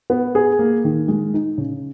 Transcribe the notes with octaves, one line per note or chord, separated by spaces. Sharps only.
B3
G#4
A#3
D#3
G#3
D#4
C#3